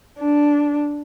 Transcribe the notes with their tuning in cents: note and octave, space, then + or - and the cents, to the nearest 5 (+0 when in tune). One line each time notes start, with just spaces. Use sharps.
D4 -5